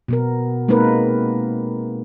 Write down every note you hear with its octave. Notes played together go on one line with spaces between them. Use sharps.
B2 B3 A#4
G#3 A#3 C4 D#4 A#4 B4